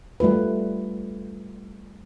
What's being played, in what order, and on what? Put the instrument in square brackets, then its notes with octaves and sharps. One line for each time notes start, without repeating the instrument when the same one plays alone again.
[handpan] G3 A3 F4 B4